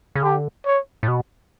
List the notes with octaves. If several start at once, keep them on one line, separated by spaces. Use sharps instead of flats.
C#3
D3 G4
C#5
A2
B2